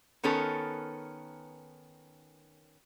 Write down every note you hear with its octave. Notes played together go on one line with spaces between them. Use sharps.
D#3 B3 C#4 A4 A#4